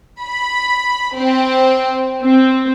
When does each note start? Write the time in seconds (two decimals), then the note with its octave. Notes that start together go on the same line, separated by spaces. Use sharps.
0.22 B5
1.16 C4
2.22 C4